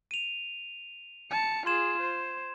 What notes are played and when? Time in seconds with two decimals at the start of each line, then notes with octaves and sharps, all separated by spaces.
0.11 D#7 F7
1.31 A5 C#7
1.66 F4 G#4 C6 G#6 E7
2.01 C5